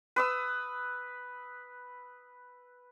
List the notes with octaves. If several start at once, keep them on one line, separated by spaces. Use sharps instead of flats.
B4 D#6 E6